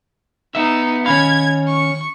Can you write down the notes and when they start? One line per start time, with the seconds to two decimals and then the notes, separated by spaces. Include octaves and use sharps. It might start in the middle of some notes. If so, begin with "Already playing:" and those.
0.55 B3 D#4 E5
1.06 D#3 C#4 C#5 F5 B5 G#6
1.67 C#6